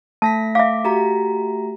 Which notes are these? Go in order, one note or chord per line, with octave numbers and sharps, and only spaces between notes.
A3 A5 A#6 B6
E5 F5 D6
F#4 G4 A#5